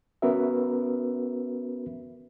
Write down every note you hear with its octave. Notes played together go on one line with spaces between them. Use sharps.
B3 C#4 F#4 A#4 B4 E5